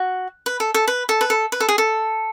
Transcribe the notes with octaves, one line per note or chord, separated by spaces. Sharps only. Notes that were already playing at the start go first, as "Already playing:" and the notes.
Already playing: F#4
B4
A4
A4
B4
A4
B4
A4
B4
A4
G#4
A4